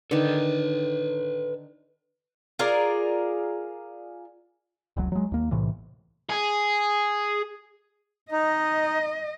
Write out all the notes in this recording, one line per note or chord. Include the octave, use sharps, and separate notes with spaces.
D3 D#3 A4 B4
F4 G#4 A#4 D5
F1 C#2 F#3
F#3 G#3
D#2 A#3
B1 A2 C3 E3
G#4
D#4 D#5